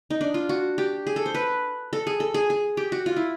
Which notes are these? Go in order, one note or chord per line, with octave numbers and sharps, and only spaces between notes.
D#4
D4
F4
F#4
G4
G#4
A4
C5
B4
A4
G#4
A4
G#4
G#4
G4
F#4
F4
E4